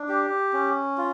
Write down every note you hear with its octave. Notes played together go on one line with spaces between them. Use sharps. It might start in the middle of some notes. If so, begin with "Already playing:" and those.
Already playing: D4
G4
C#4
F4